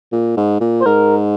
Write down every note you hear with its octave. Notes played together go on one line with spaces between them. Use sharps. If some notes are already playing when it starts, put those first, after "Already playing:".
A#2
G#2
A#2
C5
G#2 A#4